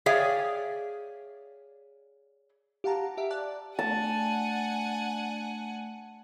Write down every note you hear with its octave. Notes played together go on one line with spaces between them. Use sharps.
G#4 C#5 D5 E5 F5 G5
G4 F5 F#5 A5 A#5
G4 E5 F5
D5 A5 D6 F#6
A3 D4 F#5 G#5 A5